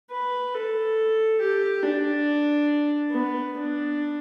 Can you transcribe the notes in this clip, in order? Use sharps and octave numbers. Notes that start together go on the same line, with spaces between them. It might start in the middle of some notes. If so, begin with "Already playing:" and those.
B4
A4
G4
D4
B3
D4